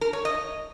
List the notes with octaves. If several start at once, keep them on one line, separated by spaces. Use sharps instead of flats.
A#4
C#5
D#5